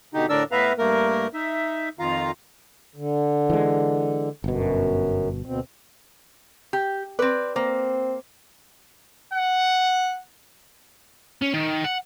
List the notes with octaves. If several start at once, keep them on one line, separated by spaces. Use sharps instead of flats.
B2 D3 D#4 G4
A2 D3 D4 A#4 D5 E6
A2 B3 B4 E5 F5 A#5
G2 A3 A#3 A#4
D#4 E5
F2 D#3 F4 F5 A#5
D3
E3 G#3
G1 F#2 B2
D2 B2 C4
G4
C4 B4 D5
A#3 C4
F#5
C#4
D#3
F#5